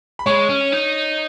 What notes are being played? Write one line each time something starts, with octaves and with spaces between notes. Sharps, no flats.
B5
G#3 C#5 C#6
C#4
D#4